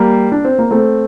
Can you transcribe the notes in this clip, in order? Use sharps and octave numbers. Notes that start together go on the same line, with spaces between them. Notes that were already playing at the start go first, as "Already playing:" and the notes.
Already playing: G3 A#3
D4
C4
A#3
A3 C4